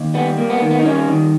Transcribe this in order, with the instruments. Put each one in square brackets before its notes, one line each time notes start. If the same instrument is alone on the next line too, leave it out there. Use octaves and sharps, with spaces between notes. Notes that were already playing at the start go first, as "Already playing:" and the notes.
Already playing: [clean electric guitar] D#2
G3 B3
A#3
B3
D#3
B3
D#4
G3 C#4
D#3